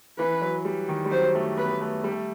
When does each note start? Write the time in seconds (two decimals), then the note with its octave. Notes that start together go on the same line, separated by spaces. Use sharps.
0.19 E3 B4
0.42 F#3
0.65 G3
0.89 D#3
1.05 G3
1.11 F#3 C5
1.35 A3
1.57 B3 B4
1.71 B3
1.82 A3
2.04 G3
2.12 A3